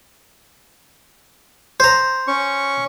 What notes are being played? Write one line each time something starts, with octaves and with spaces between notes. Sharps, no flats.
C5 A#5
C#4 C#6